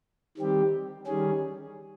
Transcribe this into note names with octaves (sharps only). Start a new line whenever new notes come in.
D#3 G3 C4 G4
D#3 G3 C#4 G#4